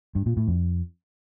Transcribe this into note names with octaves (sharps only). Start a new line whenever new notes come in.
G2
A#2
A2
F2